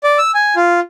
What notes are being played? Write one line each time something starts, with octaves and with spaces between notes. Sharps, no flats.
D5
E6
G#5
F4